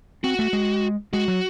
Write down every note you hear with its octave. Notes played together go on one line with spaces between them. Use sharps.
C4 F#4
A3
G#3
G#3 F#4
F#3